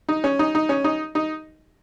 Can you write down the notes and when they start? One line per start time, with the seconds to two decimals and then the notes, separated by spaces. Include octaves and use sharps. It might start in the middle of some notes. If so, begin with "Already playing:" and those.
0.09 D#4
0.24 C#4
0.39 D#4
0.55 D#4
0.69 C#4
0.84 D#4
1.15 D#4